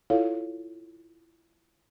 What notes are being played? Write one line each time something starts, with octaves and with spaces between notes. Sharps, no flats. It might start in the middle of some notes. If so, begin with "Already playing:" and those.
E4 F4 A4 C#5 F5